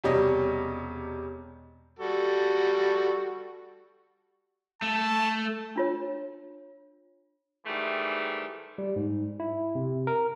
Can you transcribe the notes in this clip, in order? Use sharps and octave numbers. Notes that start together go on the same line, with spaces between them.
E1 C3 G3 C#4 D#5
G3 F#4 A4
A3 A5
D4 F4 C#5
G#2 D#3 E3 G3 A3
G3
G#2
E4
C3
A#4